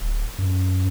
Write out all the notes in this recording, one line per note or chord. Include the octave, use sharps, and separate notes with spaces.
D1
F#2